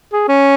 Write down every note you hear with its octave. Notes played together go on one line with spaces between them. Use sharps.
G#4
C#4